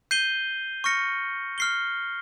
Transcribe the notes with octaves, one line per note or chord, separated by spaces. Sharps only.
G6 C7 D#7 G7
C#6 F6 A#6 C#7
F6 C7 G7